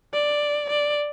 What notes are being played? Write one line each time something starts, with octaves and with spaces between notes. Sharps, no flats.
D5
D5